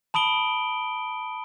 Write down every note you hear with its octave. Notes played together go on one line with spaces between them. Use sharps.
A5 B5 D#6 D7 G7